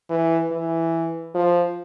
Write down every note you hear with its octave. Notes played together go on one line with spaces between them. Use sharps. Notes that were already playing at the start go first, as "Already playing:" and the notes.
E3
E3
F3